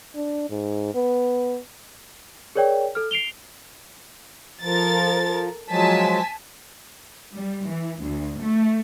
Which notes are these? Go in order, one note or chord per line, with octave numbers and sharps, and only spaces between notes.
D4
G#2
B3
G#4 A#4 C#5 D5 G5
A4 F6
C7 D7 F7 G7
F3 A4 A#4 A6
F3 F#3 G#3 G#5 A5 B6
G3
E3
D2
A3